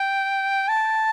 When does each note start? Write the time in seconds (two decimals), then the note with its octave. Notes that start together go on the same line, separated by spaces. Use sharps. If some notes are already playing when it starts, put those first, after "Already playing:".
Already playing: G5
0.69 A5